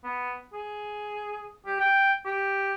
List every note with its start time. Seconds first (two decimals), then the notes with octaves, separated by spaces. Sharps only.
0.04 B3
0.53 G#4
1.66 G4
1.80 G5
2.26 G4